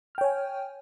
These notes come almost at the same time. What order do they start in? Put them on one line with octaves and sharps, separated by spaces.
F6 G5 C#5 G#5